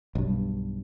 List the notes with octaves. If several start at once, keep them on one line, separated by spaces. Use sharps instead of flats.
B1 G2